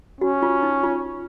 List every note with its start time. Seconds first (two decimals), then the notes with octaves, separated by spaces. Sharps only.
0.21 C#4 F#4
0.43 F4
0.63 D#4
0.83 F4